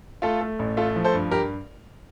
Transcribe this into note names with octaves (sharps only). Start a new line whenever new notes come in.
A3 F4 A4
A3
A1
A3 F4 A4
F3
A4 C5
G2
G4 A#4